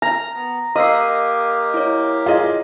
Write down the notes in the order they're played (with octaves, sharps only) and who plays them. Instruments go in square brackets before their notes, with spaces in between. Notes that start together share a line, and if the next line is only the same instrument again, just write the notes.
[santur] A#5
[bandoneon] B3
[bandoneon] A#3 G4 A#4 [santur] D#5 [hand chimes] F5 E6 C7
[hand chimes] E4 C#5
[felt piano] F4 G#4 D#5